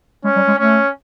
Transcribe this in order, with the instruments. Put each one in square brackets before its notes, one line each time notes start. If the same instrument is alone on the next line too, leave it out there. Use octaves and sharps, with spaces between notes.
[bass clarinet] G#3 [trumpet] C#4
[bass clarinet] G3
G#3
[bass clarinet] A3 [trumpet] C#4